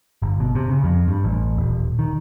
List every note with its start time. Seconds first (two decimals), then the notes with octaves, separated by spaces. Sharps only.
0.22 G1
0.40 B2
0.55 C3
0.69 C#3
0.84 F2
1.08 G2
1.24 A1
1.57 D#1
1.99 D#3